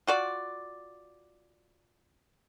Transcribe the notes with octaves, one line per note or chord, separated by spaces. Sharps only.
F4 F#4 D5